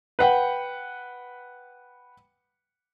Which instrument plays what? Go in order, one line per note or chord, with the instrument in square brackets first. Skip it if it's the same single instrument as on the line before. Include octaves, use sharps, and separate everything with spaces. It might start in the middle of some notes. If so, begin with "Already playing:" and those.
[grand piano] B4 F#5 G5